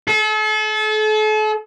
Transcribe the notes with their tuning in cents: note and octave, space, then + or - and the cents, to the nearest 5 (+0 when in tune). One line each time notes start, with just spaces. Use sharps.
A4 -40